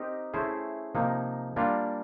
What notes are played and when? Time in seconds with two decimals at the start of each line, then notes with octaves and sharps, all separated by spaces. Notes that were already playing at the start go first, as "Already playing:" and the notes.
Already playing: C4 D#4 G4 A#4 D#5
0.34 A3 C#4 E4 G#4 C5
0.95 C3 F3 A#3 D#4
1.56 G3 A#3 D4 F4